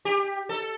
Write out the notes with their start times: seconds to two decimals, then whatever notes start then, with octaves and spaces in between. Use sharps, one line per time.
0.05 G4
0.49 A4